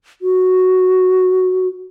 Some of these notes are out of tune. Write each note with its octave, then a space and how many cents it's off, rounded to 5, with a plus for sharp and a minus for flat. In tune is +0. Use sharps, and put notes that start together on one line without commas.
F#4 +0